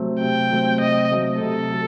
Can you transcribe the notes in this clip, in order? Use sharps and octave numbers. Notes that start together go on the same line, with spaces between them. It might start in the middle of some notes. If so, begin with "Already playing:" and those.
Already playing: C3 F#3 A3 C4
C3 G5
F#3 A3 C4
C3 D#5
F#3 A3 C4
C3 A4
F#3